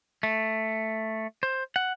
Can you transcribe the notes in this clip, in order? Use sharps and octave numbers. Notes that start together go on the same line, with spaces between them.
A3
C5
F#5